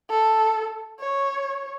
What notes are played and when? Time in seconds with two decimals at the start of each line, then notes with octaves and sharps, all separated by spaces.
0.10 A4
1.00 C#5